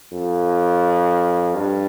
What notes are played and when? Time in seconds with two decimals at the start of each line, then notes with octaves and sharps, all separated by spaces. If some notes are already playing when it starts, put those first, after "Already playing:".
0.13 F2
1.55 G2